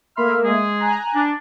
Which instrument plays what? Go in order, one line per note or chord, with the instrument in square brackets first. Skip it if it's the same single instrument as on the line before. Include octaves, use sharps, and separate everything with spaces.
[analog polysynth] A3 A#3 E5 [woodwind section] B5 C6 F6
[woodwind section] G#3 G#4
[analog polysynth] G#5 A#5 F#6
[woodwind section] D4